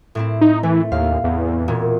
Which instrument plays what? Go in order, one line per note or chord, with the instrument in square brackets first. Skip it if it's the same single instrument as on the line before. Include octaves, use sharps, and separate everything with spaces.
[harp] A2 C4 E4
[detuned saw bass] D#4
[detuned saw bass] E3 [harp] A3
[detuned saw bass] D#2 [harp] F5
[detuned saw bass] E2
[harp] E1 A#2